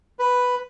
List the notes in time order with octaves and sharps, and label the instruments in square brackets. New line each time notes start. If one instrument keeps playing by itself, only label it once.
[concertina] B4